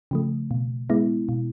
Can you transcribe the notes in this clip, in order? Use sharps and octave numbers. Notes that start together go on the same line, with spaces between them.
C#3 F3 A3
B2
G#3 B3 E4
B2